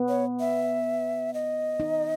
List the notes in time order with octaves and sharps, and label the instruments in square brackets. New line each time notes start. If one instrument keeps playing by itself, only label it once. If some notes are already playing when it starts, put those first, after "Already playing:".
Already playing: [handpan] B3
[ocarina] C#5
E5
D#5
[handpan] D#4